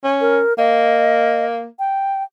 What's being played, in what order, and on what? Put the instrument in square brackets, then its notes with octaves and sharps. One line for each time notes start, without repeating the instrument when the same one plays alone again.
[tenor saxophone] C#4
[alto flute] A#4
[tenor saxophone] A#3 [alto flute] D#5
[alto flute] G5